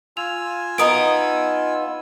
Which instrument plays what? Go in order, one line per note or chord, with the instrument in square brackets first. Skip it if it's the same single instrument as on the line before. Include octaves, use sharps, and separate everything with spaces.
[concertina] F4 G#5 E6 [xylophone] F7
[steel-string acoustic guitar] B3 D#4 D#5 [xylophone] A#5 D#6 D7